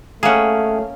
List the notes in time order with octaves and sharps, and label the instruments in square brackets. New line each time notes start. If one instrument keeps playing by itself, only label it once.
[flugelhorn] A3 [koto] A#3 C#4 [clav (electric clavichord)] G#4 F#5